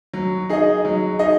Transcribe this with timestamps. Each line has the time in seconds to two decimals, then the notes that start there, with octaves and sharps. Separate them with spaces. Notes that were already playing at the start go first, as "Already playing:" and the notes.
0.14 F#3
0.49 D#4 G#4 D#5
0.85 F#3
1.19 D#4 G#4 D#5